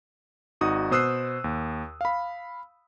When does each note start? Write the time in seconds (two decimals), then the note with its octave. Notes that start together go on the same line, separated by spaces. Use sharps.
0.61 G#1 D#4 F#4 D#6
0.91 B2 C5 D#6 E6 F#6 C7
1.44 D#2
2.01 F5 B5